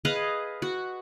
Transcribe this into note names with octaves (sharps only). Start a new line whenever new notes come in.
G#4 B4 D#5 F5
F#4